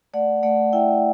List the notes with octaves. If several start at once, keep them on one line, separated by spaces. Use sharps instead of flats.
A3 D5 F#5
A3 D5 F#5
E4 E5 G5